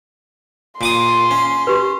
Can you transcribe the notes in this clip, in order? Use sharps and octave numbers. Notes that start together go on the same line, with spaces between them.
A#2 C6 D6 D#6
C#4
G4 B4